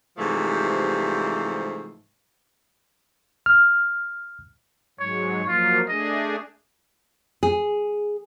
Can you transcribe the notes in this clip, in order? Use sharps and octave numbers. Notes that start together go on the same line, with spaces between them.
G#2 C3 E3 F3 G3 A3
F6
G#2 F#3 G#3 C#5
F3 F#3 A#3 F4
A3 D4 G#4 D#5
G#4